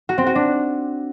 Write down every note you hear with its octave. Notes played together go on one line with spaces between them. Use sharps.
F#4
C4
F#4
D4